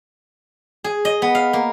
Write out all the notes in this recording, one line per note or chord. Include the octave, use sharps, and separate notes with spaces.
G#4
D#5
B3
F5
A#3